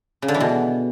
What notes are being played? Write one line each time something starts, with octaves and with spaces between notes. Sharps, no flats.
C#3
D3
E3
B2